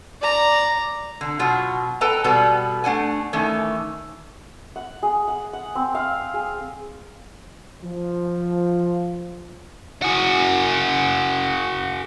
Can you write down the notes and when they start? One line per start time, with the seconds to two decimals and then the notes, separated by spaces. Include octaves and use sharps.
0.21 D5 A#5
1.21 D3
1.39 B2 F#3 F4 F#4
2.01 A4 B4 G5 A5 A#5
2.24 B2 G3 B3 A4
2.84 A3 D4 F#5 G#5
3.33 D#3 E3 A3 C#4
4.76 F#5
5.03 G#4
5.28 F#5
5.53 F#5
5.75 C4
5.95 F5
6.34 G#4
7.85 F3
10.02 F#4 G#4